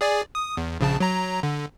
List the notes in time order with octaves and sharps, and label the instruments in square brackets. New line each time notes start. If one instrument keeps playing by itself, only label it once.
[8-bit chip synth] G#4 D5 G#5
D#6
E2
A#1 C#3 A5
F#3 A#5
D3